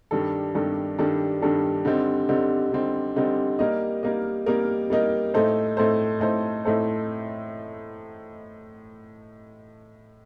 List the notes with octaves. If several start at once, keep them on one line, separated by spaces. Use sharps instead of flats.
G2 D#3 G3 D4 A4
G2 D#3 G3 D4 A4
G2 D#3 G3 D4 A4
G2 D#3 G3 D4 A4
D3 G3 C4 D#4
D3 G3 C4 D#4
D3 G3 C4 D#4
D3 G3 C4 D#4
G3 A#3 D#4 A#4 D#5
G3 A#3 D#4 A#4 D#5
G3 A#3 D#4 A#4 D#5
G3 A#3 D#4 A#4 D#5
A2 A3 D#4 A4 C5
A2 A3 D#4 A4 C5
A2 A3 D#4 A4 C5
A2 A3 D#4 A4 C5